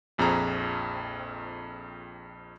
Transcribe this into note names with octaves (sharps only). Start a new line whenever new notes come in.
A#1 F2 C4 G#4 A#5